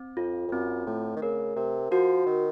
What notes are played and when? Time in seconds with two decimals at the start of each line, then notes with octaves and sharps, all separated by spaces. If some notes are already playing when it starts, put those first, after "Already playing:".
Already playing: C4
0.17 F2 F4
0.48 F2
0.52 F#2 C4
0.86 A2 A3
1.16 D#3
1.22 C#3 A#4
1.56 C3 A#4
1.91 F3 F#4
2.26 D#3 A#4